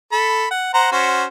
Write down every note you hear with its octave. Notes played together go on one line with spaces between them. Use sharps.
A4 B5
F#5
C5 F#5 A#5
C#4 F#4 C5